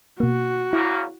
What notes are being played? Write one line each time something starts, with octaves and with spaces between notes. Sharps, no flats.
B2 A#3 F#4
E2 C#3 A#3 E4